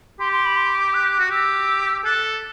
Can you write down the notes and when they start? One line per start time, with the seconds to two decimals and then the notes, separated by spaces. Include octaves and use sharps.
0.20 G4 C6
0.33 C6
0.46 B5
0.57 C6
0.75 D6
0.94 F#6
1.19 F#4
1.30 G4 E6
2.05 A4 F#6